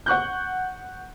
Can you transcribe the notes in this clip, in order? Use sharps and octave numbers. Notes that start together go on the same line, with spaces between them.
F#5 C#6 F#6 G6